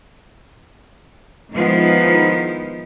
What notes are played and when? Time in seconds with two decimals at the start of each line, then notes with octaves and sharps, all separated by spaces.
1.52 D#3 F3 G#3 B3 D#4 E4